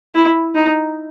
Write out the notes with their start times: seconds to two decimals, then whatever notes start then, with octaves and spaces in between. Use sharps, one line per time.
0.15 E4
0.55 D#4